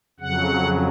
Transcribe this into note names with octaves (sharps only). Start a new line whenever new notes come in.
F2 C#3 F#3 F#5